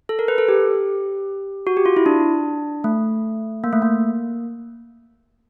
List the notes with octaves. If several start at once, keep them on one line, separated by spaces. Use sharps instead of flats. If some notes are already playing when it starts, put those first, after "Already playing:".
A4
A#4
B4
A4
G4
F#4
G4
F4
E4
D4
A3
A#3
A3
A#3